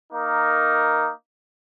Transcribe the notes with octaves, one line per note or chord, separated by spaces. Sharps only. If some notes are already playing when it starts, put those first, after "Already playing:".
A#3 D#4 A#4